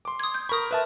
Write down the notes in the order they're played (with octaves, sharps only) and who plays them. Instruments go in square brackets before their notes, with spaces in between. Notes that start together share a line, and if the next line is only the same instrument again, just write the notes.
[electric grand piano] C6 D6
[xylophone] D#6 G#6
G6
[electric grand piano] A#4 B5 [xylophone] C#6 D#6
[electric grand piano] B4 E5 A5